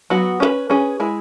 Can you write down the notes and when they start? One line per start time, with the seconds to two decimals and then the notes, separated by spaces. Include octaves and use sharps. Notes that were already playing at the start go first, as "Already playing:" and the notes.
0.10 F#3 B3 F#4
0.40 C#4 G#4 B4
0.70 C#4 G#4 B4
1.00 G#3 E4 G#4